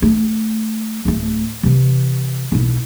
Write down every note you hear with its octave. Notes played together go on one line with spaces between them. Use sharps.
A3
D1 A3
C3 E3
B1 E4